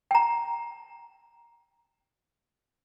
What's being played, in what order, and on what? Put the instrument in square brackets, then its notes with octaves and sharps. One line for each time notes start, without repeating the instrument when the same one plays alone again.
[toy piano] G5 A#5